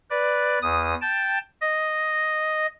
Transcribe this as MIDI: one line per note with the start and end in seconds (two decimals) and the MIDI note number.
0.10 0.59 71
0.10 0.59 74
0.62 0.94 40
0.62 0.94 87
1.02 1.39 79
1.02 1.39 81
1.61 2.67 75